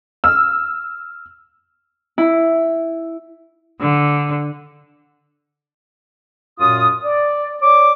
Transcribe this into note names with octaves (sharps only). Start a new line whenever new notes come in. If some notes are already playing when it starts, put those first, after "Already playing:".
E6 F6
E4
D3
F#2 A#2 F4 D#6
D5
C#5 D5 D6